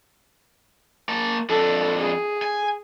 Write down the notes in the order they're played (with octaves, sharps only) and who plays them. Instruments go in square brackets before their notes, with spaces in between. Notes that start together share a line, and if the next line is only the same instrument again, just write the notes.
[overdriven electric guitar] A#3 A5
[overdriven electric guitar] F2 D4 [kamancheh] A4
[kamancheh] G#4
[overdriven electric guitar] G#5